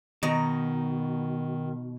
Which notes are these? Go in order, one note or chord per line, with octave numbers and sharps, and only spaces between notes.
B2 D#3 D#4 A#5